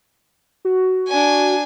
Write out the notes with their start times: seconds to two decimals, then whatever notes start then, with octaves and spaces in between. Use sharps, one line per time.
0.65 F#4
1.08 D4 G#5